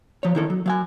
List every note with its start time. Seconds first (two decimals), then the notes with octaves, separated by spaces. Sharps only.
0.23 F3 C#5
0.35 D#3 E4 A4
0.50 F#3
0.66 F#3 F5 G#5